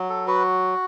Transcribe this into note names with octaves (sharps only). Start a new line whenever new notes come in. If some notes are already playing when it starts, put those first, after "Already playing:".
Already playing: F#3
A4
F#4 B4